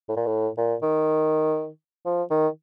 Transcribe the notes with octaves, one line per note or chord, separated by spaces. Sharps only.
A2
A#2
A2
A#2
D#3
F3
D#3